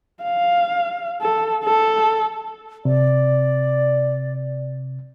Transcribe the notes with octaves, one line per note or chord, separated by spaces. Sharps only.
F5
A4
A4
C3 D5